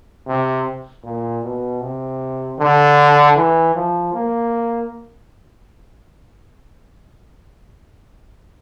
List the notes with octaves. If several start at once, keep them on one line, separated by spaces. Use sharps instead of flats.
C3
A#2
B2
C3
D3
E3
F3
A#3